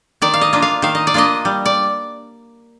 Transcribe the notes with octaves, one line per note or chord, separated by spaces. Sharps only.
D#3 D5
F5
D#5
A#3 D4 F4
F5
D#3 F5
D#5
D5
A#3 D4 F4 D#5
G3
D5